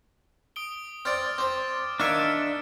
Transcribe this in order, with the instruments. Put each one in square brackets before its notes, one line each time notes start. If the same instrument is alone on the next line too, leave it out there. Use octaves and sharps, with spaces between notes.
[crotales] D#6 D7 G7
[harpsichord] C4 D5 [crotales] F6 A6 D7
[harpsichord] C4 C5 [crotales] D6
[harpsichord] D#3 F5 G#5 [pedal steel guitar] D4 E5 [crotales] F6 C#7 D7